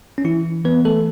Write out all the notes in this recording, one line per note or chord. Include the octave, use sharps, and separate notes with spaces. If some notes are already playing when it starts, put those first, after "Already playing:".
C#4
E3 E4
E3 B3 B4
A3 A4